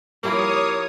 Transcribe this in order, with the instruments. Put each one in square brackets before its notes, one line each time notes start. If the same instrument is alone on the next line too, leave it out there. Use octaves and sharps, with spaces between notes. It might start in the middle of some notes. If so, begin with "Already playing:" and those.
[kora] F3 G3 E4 [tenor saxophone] A#3 [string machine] C#5 D#6